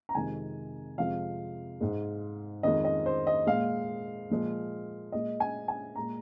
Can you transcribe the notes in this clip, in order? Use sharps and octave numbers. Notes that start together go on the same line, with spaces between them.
A#5
F2 C3 D#3 G#3 G#5
F2 C3 F3 G#3 F5
G#2 G#3
F2 D#3 G#3 D#5
D#5
C5
D#5
A#2 G#3 F5
A#2 F3 G#3
A#2 G#3 D#5
G#5
G#5
A#2 G#3 A#5